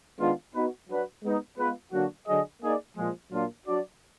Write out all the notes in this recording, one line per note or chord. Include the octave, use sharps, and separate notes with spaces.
D#3 G#3 B3 D4 F4
B3 D#4 F#4 B4
F#3 D4 F#4 B4
G#3 B3 D#4
G#3 B3 F4 B4
D3 F#3 A#3 D4 F#4
D3 F#3 D4 G#4 D#5
A#3 D#4 G#4 D5
A#2 F3 G#3
A#2 F#3 A#3 D4 F4
F#3 D4 F#4 D5